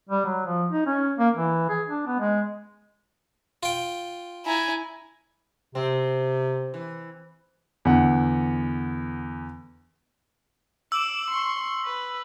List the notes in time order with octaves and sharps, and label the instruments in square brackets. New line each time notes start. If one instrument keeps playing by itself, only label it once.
[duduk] G3
F#3
F3
D#4
C#4
A#3
E3
G#4
D4
B3
G#3
[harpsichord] F4 G5
[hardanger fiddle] E4 A#5 [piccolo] G#5
[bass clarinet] C3 [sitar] C4
[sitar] E3
[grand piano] E2 D3 F#5
[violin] D6 E7 [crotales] E6 F#7
[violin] C6 C#6
B4